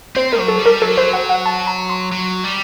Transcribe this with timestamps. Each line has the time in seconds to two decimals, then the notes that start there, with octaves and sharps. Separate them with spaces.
0.16 C4 C5
0.33 A#4
0.39 F#3
0.48 A4
0.59 G3
0.66 A#4
0.82 F#3 A4
0.97 C5
1.13 F#5
1.29 F#5
1.46 A5
1.67 A#5
1.89 C6
2.12 F#3
2.44 G3